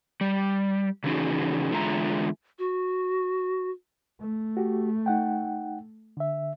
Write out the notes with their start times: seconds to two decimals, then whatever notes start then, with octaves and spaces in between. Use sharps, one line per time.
0.21 G3
1.04 C#3 E3 C#4 D#4 F#4 G#4
1.71 E2 D3 G#3 F4 E5 A#5
2.59 F#4
4.20 A3
4.57 F#4 G4
5.06 D#4 F#5 G5
6.17 D3 E5